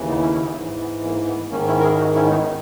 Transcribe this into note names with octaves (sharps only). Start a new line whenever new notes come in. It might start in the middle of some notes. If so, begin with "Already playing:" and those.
Already playing: D#2 C#3 E3
B3 D#4
C#4 E4
C#4 E4
B3 D#4
G#2 E3
B3
A#3
B3
G#2 D#3 A#3 C#4
C#4 E4
A#4
E4 G#4
D#4 F#4
C#4 E4
B3 D#4